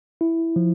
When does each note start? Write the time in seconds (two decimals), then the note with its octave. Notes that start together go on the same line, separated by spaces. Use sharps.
0.21 E4
0.56 F3